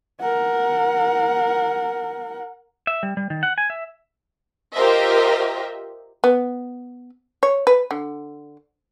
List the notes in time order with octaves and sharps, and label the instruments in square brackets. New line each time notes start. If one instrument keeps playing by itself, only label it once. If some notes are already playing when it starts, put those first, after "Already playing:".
[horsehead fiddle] A#4 F#5
[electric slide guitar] E5
G3
G3
D#3
F#5
G#5
E5
[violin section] F4 G4 A#4 C5 D#5 E5
[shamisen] B3
C#5
B4
D3